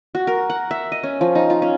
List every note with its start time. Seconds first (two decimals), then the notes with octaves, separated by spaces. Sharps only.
0.15 F#4
0.27 A#4
0.50 F#5
0.71 E5
0.92 D#5
1.03 C#4
1.21 F3
1.35 D#4
1.50 F4
1.62 C#4